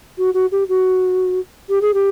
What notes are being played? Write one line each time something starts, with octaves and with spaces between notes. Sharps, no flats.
F#4
F#4
G4
F#4
G4
G#4
G4